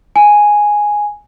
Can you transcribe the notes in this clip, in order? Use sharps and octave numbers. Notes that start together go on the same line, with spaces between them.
G#5